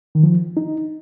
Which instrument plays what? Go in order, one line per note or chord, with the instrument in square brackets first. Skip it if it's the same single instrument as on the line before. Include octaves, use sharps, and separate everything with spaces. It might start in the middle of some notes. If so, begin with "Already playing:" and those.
[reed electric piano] D#3
F3
D#4